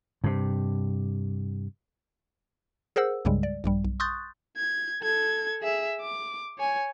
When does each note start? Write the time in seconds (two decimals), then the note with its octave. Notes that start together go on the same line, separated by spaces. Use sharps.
0.24 G2 C3
2.96 G#4 A#4 C5 F#5 E6
3.25 C2 G2 C#3 G3 G#3
3.43 D5
3.64 A#1 G2 G3
3.84 B1
4.00 C6 C#6 D#6 F#6 G6 A6
4.57 G#6
5.02 A4 G#6
5.61 G#4 E5
6.01 D6
6.58 C#5 G#5